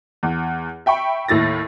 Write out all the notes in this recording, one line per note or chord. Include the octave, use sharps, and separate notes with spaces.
E2
E5 G5 B5 C#6
D#2 A2 E4 A6 A#6